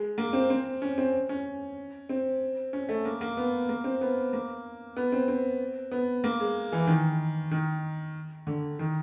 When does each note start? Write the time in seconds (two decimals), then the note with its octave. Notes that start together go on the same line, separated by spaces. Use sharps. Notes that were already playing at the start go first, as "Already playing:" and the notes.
Already playing: G#3
0.18 A#3
0.33 C4
0.50 C4
0.82 C#4
0.98 C4
1.29 C#4
2.09 C4
2.73 C#4
2.89 A3
3.05 A#3
3.21 A#3
3.37 B3
3.69 A#3
3.84 C4
4.01 B3
4.33 A#3
4.97 B3
5.12 C4
5.28 C4
5.92 B3
6.24 A#3
6.40 G#3
6.72 E3
6.87 D#3
7.51 D#3
8.47 D3
8.79 D#3